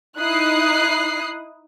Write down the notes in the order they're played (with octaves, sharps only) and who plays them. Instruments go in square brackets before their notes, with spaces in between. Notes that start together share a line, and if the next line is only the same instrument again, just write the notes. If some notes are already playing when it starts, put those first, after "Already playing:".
[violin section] D#4 E4 D#6 F#6 C7